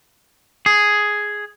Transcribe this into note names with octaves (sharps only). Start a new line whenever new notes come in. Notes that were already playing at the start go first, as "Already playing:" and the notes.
G#4